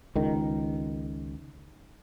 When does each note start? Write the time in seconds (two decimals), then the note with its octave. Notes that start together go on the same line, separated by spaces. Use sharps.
0.16 C#2 D#3